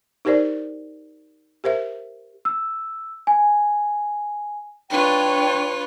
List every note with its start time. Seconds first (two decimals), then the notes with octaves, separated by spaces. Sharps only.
0.25 D#4 G4 A#4 C5 D5
1.64 G4 A#4 C5 E5
2.45 E6
3.27 G#5
4.90 D4 F4 B4 C#5 G5